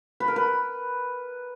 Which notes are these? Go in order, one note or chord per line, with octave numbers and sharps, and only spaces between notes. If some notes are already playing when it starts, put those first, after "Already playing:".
B4
A#4
B4